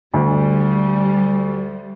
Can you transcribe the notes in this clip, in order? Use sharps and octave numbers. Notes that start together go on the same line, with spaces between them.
D2 G3